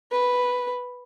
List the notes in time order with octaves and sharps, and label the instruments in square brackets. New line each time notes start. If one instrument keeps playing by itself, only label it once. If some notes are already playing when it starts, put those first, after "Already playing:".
[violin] B4